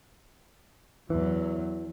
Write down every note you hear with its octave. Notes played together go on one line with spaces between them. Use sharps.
E2 E3 F#3